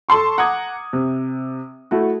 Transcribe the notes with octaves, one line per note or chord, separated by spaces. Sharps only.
A4 A5 C6 C#6
F#5 A#5 D6 D#6 G#6
C3
A3 E4 F#4